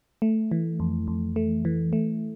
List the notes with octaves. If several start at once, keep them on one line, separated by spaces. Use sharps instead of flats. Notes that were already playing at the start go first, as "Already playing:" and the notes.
A3
E3
F2
F2
A3
E3
A3